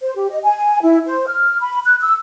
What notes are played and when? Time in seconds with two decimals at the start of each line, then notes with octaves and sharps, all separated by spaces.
0.01 C5
0.16 G4
0.30 D#5
0.43 G#5
0.82 E4
1.06 C5
1.27 F6
1.60 B5
1.84 F#6
2.01 E6